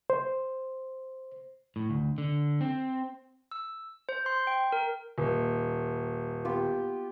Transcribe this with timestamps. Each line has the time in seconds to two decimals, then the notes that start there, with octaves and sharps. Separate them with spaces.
0.10 C5
1.76 A2
1.90 D2
2.18 D3
2.61 C4
3.51 E6
4.09 C5
4.26 C6
4.47 G5
4.72 A#4
5.18 D#1
6.45 B3 F4 G4